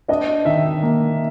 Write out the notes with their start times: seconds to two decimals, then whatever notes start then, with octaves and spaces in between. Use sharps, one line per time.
0.08 D4 D#5
0.45 D#3 E5
0.82 A#3